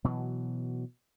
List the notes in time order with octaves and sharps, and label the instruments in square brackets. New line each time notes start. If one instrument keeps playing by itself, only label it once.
[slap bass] B2 E3 F#3